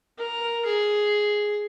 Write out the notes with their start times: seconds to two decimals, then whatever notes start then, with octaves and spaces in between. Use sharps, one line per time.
0.18 A#4
0.66 G#4